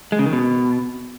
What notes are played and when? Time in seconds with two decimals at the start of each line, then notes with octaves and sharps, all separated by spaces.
0.12 G#3
0.19 C#3
0.26 D#3
0.33 B2